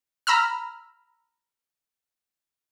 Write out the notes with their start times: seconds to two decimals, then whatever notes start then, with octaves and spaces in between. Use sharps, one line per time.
0.27 A#5 B5 E6 F6